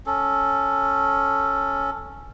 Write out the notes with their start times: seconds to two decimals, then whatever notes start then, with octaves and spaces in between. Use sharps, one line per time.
0.06 C#4 A4